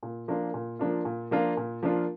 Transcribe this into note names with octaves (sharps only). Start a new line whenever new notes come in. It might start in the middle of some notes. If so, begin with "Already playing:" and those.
A#2
F3 A#3 D4 F4
A#2
F3 A#3 D4 F4
A#2
F3 A#3 D4 F4
A#2
F3 A#3 D4 F4